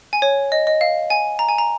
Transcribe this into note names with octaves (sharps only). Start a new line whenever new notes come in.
G#5
C#5
D#5
D#5
F5
G#5
A#5
G#5
A#5